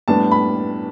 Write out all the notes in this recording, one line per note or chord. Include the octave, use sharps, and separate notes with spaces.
A2 G3 B3 D4 A5
B5